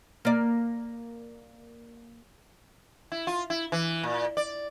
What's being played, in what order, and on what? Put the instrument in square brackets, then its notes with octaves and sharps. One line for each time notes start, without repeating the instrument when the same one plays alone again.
[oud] A#3 D5
[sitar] E4
F4
E4
E3
A#2
D5